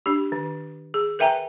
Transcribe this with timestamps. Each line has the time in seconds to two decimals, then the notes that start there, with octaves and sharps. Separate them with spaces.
0.06 D4 G4
0.32 D#3
0.94 G#4
1.19 A#4 B4 E5 G5 G#5 A#5